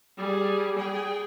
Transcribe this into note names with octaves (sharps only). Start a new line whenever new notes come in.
G3 G#4
G#4 G5